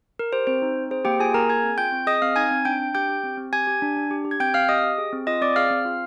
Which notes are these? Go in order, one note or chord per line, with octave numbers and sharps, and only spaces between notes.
A#4
G4 C5
C4 C5
D#4
C4
G#4 C5
A#3 G4 G5
F4 G#4 G#5
A#3 A#4 A#5
G#4 G#5 G#6
C4
F4 G5 G6
C4
G#4 D#5 D#6
C4 F5 F6
D#4 G#5 G#6
C4
D4 G5 G6
D4
G4 G5 G6
G4
C4
C4
G4 G#5 G#6
G4
D4
D4
G4
G4
G#6
C4 G5 G6
C4 F5 F6
G4 D#5 D#6
G4
G#4
C4
F4 D#5 D#6
C4 D5 D6
G#4 F5 F6
C4
F4